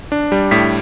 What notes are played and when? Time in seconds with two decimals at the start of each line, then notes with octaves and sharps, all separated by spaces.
0.12 D4
0.32 G3
0.51 A2 B6